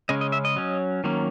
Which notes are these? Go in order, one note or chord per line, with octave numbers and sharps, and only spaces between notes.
C#3 G#3 C#4 D#5
D#5
E5
D#5
F#3 C#4
D#3 F#3 A#3 C#4